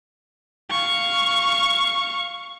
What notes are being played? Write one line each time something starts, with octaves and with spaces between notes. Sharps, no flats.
F5 C#6